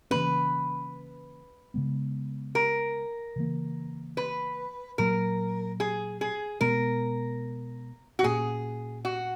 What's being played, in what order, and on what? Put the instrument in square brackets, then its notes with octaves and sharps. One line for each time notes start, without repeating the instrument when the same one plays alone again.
[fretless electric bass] C#3 E3 A#3 C#4 [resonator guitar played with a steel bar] B4
[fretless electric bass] C#3 G#3 B3
[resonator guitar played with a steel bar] A#4
[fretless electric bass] C#3 E3 A#3
[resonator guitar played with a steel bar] B4
[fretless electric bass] A#2 F#3 A#3 [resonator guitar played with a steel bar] A#4
[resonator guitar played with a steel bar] G#4
G#4
[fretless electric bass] B2 G#3 B3 [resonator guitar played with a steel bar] A#4
[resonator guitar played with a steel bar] F#4
[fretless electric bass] A#2 A#3 C#4 [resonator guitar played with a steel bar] G#4
[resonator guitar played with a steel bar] F#4